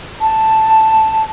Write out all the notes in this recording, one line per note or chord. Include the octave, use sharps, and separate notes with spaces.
A5